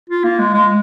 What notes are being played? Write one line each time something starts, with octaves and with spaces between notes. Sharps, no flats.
F4
A#3
G#3
G#3